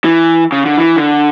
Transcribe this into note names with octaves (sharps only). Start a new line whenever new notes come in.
E3
C#3
D3
E3
D3